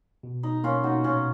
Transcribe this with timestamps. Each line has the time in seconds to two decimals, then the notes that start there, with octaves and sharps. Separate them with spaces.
0.23 B2
0.43 B2 D#4
0.64 A#3 C#4 F4
0.84 B2 D#4 F#4
1.04 A#2 C#4 F4